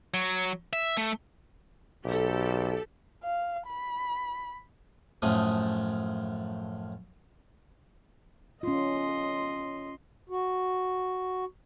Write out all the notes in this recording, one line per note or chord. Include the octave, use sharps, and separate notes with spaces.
F#3
E5
A3
B1 G4 A4
F5
B5
F#2 A2 F3 A3 D#6
C#4 F4 D#5 C6
F#4